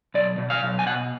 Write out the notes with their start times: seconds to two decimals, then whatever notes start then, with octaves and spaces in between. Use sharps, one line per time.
0.14 B1 D5
0.38 B2
0.50 F5
0.63 B1
0.79 G#5
0.86 B2 F#5